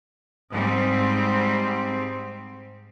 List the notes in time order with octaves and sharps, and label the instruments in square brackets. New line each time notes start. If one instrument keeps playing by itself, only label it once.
[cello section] G#2 G3 C4